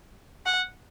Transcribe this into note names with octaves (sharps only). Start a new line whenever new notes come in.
F#5